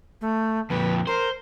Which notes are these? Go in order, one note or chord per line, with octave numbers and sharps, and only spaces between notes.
A3
F2 A#2 B4
A#4 C5